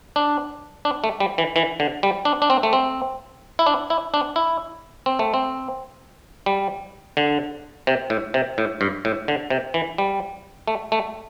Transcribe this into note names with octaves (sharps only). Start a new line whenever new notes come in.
D4
D4
A3
G3
E3
E3
D3
G3
D4
D4
C4
A3
C4
E4
D4
E4
D4
E4
C4
A3
C4
G3
D3
C3
A2
C3
A2
G2
A2
D3
C3
E3
G3
A3
A3